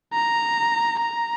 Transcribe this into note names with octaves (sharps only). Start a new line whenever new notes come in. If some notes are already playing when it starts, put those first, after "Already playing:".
A#5
A#5